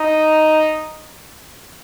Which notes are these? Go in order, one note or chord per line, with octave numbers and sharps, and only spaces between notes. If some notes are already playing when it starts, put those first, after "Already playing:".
Already playing: D#4